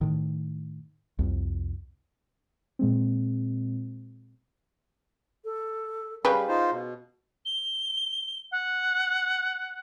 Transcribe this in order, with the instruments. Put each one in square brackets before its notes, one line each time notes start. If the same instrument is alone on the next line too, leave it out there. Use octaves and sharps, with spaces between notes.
[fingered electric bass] A2 D#3
C2 F2
[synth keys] A#2 G#3 C4
[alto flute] A4
[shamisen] C#3 B4 G5 [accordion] G3 [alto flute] F5
[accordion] D#4 F4 C5
B2
[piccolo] G7
F#5